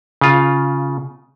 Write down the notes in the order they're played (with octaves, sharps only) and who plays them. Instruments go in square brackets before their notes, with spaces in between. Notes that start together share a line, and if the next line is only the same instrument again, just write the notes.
[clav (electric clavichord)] C#3 F4